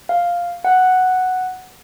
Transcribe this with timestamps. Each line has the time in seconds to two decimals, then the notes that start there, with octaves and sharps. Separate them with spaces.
0.09 F5
0.65 F#5